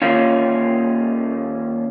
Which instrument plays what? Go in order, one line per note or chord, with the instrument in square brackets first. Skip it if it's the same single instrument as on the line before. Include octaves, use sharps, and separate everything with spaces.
[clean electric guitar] D#2 D#3 A#3 C#4 F4